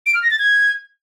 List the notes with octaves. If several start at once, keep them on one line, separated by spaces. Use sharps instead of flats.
D7
F6
A#6
A6
G#6